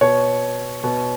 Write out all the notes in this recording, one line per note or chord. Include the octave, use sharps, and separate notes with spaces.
B2 C#5
B2